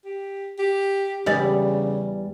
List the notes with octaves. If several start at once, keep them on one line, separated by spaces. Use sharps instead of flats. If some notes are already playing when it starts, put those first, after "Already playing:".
G4
G4
E2 C#3 G3 D5